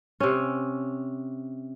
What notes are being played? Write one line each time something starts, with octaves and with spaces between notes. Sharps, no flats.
C3 C#4